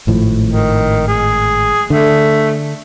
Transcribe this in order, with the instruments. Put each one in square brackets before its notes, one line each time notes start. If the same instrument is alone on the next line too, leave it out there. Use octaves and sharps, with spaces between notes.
[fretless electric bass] G#1 A2 F3
[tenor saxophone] D#3
G#4
[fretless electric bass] D3 [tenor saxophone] A3